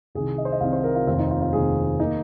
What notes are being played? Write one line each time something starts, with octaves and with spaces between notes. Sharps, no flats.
C2 C3 D#3 G#4
D#5
C5
D#5
C2 C3 D#3 F5
C5
A#4
F4
F1 D#2 D#3 C4 F4
D#4
F4
F4
F1 D#2 D#3 C4 G#4
D#3 A#3 D#4